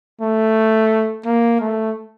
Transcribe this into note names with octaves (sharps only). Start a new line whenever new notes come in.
A3
A#3
A3